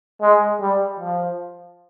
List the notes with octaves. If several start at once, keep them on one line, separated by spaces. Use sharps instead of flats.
G#3
G3
F3